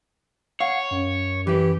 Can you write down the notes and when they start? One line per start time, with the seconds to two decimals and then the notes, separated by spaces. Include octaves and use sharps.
0.60 C#5 F5 F#5
0.91 F#2
1.47 E3 G4 B4